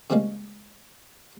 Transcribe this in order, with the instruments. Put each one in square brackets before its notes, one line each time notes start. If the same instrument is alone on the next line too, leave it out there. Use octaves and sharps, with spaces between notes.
[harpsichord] C#3 F3 G3 G#3 A#3